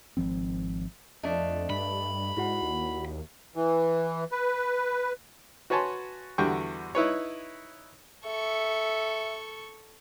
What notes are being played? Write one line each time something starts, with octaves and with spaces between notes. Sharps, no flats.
G#1 F#2 F3 C4
F2 A3 D4 D#5
G2 B5
G#2 E4 F#4 F#5
D#2
E3
B4
F#4 B4 C#5 G#5 A5 C6
E2 D3 G3 F#4 G5 C#6
D#4 E4 B4 C#5
A4 E5 C#6